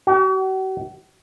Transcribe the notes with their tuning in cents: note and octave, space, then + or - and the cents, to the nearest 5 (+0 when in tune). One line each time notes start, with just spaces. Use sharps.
F#4 +45